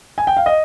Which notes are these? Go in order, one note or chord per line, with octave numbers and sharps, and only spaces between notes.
G#5
G5
F5
D#5